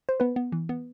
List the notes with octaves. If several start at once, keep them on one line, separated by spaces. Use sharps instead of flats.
C5
B3 B4
B3
E3
B3